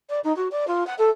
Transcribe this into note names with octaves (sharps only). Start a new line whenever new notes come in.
D5
D#4
F#4
D5
F4
F#5
A4